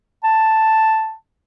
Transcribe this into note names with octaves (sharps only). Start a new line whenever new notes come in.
A5